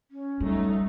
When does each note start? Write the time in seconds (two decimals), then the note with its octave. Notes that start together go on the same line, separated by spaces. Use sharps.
0.11 C#4
0.40 F#3 G3 A3 D#4